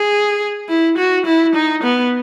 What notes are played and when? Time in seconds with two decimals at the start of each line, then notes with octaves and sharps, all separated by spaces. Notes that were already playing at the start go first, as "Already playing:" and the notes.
Already playing: G#4
0.69 E4
0.98 F#4
1.26 E4
1.55 D#4
1.83 B3